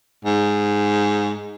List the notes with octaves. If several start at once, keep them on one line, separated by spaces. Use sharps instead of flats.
G#2